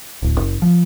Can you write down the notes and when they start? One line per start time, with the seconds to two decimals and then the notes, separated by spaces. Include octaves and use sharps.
0.23 D1
0.38 F#1
0.62 F3